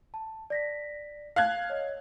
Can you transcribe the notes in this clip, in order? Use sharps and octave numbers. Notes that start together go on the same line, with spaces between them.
A5
D5 A#6 B6
F5 F#6 G#6
C#5 D#5